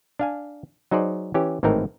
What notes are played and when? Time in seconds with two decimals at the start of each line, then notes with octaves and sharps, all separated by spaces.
0.19 D4 F5 G#5
0.91 F#3 D#4 G#4 C5 D5
1.34 E3 C#4 G4
1.63 G#1 A2 E3 C4 D#4 A#4